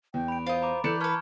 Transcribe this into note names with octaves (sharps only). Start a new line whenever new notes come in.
E2 G5
B5 D7
F4 C5 D#5
A#5 B5 D6
E3 A4 D5 B5 D6 G6 C#7 E7
B3 B4 A5 C#6 F6 G#6